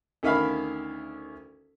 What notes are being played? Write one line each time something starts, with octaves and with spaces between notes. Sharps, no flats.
D2 D#3 C#4 E5 F5 B5